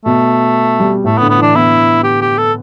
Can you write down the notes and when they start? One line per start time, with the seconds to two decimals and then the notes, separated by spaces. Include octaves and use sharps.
0.05 B2 A3
0.80 G3
1.04 A2 A3
1.18 B3
1.22 D3
1.30 B3
1.38 E3 D4
1.54 B3 E4
2.04 G4
2.21 G4
2.38 A4